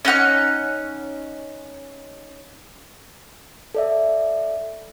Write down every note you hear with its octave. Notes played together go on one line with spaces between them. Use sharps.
C#4 D#4 F#5 F6
A4 D5 E5